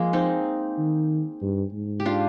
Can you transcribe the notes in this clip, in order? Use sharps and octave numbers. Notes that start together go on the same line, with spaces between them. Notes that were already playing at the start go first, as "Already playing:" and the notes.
Already playing: F3 G#3 A#3
C4 D#4
D#3
G2
G#2
G4
D4 F4